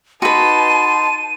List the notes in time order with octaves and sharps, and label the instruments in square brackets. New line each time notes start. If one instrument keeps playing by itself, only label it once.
[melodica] D#4 C6 [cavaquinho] F#4 B4 [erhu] A5 [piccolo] D#7